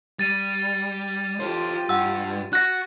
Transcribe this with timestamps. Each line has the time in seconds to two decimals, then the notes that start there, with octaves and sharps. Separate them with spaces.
0.19 G3 A6 D#7
1.40 F4 G4 A4 C5
1.89 G2 F#5 E6
2.53 F#4 F#6 A#6